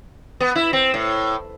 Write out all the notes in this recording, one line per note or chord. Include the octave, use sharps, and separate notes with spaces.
B3
E4
C4
A2